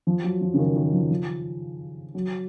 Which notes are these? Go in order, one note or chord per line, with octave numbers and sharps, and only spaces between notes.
F3
F#3
F3
C#3
D#3
D#3
F3
F3
F#3